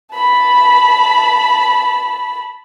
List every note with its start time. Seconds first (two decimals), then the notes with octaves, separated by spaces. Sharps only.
0.14 A5 B5